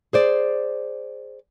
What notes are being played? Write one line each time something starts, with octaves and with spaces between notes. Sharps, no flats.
G#4 C5 D5